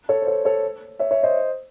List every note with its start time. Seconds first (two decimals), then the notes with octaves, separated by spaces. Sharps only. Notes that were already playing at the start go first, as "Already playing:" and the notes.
0.09 A4 C#5
0.22 C5
0.27 A4 C#5
0.45 A4 C#5
0.99 C#5 E5
1.11 C#5 E5
1.23 C5 D#5